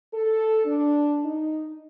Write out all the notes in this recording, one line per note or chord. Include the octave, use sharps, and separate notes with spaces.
A4
D4
D#4